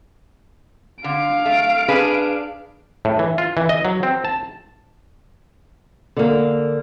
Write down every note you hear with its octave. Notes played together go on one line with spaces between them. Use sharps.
D3 F5 D7
A3
D4 G#4 B4
A2
E3
F4
E3
D#5
F#3
C4
A5
D3 A#3